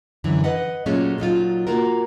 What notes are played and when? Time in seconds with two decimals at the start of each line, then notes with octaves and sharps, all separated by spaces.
0.24 F#2 D3 E3
0.44 B4 D#5 F#5
0.86 A#2 F#3 G#3 A3 C#4 F4
1.18 A#2 F#3 D#4 F4
1.67 A#3 F4 F#4 A#4